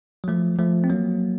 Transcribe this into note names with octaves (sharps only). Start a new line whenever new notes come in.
F#3
F3 A3
F3 A3
C4
F#3 A#3